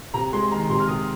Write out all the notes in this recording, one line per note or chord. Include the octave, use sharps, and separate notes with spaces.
C3 A#5
G#3 C6
D#3 A#5
C3 C6
F6
C3 D#6